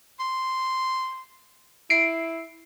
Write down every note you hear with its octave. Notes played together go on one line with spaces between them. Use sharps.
C6
E4 C7 D7